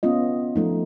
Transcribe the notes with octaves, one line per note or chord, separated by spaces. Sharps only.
B3 C#4 F4 D#5
F3 A3 D#4